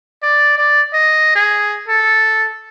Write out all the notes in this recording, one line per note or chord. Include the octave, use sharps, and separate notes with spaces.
D5
D5
D#5
G#4
A4